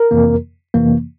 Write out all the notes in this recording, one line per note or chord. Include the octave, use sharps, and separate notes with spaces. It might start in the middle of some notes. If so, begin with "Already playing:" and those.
Already playing: A#4
F2 C3 E3 A#3
F2 C3 E3 A#3